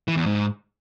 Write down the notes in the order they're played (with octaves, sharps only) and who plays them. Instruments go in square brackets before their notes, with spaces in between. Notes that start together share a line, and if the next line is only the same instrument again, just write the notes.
[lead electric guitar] E3
E2
G#2